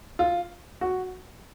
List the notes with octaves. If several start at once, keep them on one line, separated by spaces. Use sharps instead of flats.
F4
F#4